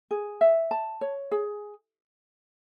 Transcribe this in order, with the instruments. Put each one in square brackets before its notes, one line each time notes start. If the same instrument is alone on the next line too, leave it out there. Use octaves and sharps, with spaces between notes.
[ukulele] G#4
E5
A5
C#5
G#4